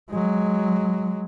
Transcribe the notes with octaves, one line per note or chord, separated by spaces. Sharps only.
F#3 G#3